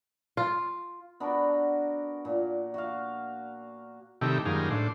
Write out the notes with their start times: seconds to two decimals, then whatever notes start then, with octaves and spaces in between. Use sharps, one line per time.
0.37 F4
1.20 B3 D4 F#4 A#4
2.25 A#2
2.74 F#4 F5
4.21 C3 D#3 G3 A3 E4 G4
4.45 F#2 D#3 G3 G#3 A#3 F4
4.70 A2 D4 C5